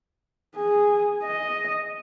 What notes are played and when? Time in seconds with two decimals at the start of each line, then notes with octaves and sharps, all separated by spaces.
0.56 G#4
1.23 D#5